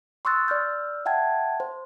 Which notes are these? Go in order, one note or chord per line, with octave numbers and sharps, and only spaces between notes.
C6 C#6 D#6 E6 F#6 A6
D5 E6 F6 G6
E5 F#5 G5 A5 G#6
C5